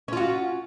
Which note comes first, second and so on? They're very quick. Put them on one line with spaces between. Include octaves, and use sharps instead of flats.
C#4 F4 F#4